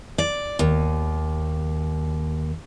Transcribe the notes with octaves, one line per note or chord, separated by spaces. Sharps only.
D5
D#2